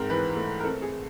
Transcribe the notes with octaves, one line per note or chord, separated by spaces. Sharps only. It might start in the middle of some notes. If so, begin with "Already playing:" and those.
Already playing: G#2 C4 A#4
E3 B4
A3
A#4
C4 A4
G#4